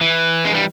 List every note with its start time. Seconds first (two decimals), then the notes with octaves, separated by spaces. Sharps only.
0.01 E3
0.45 G#3
0.54 G3